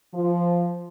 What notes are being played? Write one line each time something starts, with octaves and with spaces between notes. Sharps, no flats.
F3